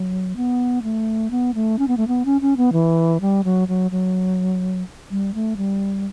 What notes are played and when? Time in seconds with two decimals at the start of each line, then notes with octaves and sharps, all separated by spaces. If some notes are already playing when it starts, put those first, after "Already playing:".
Already playing: F#3
0.36 B3
0.83 A3
1.31 B3
1.55 A3
1.79 C#4
1.88 B3
1.97 A3
2.08 B3
2.25 C#4
2.41 C#4
2.57 B3
2.73 E3
3.21 G3
3.44 F#3
3.68 F#3
3.91 F#3
5.11 G3
5.34 A3
5.57 G3